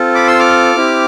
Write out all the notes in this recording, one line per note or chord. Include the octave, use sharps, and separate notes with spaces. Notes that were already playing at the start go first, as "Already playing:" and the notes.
Already playing: C4 F4 A4
B5 D6
C6 E6
D6 F6
C4 E4 G4